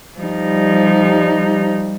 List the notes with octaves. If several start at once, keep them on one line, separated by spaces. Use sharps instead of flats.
F3 G3 D#4